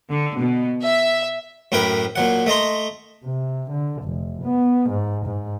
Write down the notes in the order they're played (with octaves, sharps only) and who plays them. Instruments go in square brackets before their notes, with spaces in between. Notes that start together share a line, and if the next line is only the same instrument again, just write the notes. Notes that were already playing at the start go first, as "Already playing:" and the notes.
[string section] D3
B2
E5
[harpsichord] F#2 A2 A#4 B4 G5 B5
A#2 F#3 F#5
A3 D#5 A#5 C6
[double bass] C3
D3
F1
B3
G#2
G#2